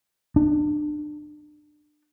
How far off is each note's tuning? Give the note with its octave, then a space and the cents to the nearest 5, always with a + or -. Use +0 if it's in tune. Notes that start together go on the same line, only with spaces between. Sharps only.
D4 +30